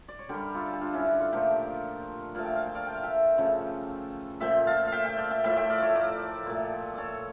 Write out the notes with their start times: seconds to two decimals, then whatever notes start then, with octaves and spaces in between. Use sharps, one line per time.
0.08 D5
0.19 C#5
0.29 D3 G3 G4 A#4
0.54 F4 A4
0.73 G4
0.81 D4 F4
0.93 C#4 E4
1.06 D4
1.20 F4 A4
1.32 A#2 F3 A3 G4 A#4
2.35 A#2 F3 A3 F5
2.45 G5
2.56 F5
2.66 G5
2.75 D5 F5
2.87 G5
2.94 F5
3.03 E5 G5
3.38 C#3 F3 A3
4.40 A#2 F3 A3 E5 G5
4.67 F5 A5
4.87 E5 F5 G5
5.05 E5 G5
5.18 D5 F5
5.31 E5 G5
5.44 A2 F3 A3 E5 G5
5.56 E5 G5
5.70 D5 F5
5.82 C#5 E5
5.95 A#4 D5
6.46 A#2 A3
6.93 A4 C#5 D5